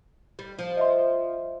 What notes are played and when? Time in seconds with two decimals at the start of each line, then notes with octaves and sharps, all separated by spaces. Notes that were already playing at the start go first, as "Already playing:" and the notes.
0.39 G3
0.59 F3
0.77 D#5 E5 C6